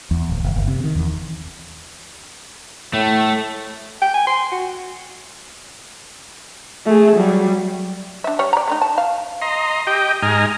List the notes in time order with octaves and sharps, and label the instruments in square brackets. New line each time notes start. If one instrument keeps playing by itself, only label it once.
[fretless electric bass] E2
D1
F#1
F#1
C3
D#3
E2
[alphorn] A2 [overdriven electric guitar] A3
[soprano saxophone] G5
G#5
C6
F#4
[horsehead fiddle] A3 G#4
F#3 G3
[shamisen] D4 E5
G3 C#5
D5 A#5
A3 A#3 D#4
A5
F5
[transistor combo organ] D#5 A#5 C6
G4 D#5 G5
G#2 D#5 G#5 A#5 F6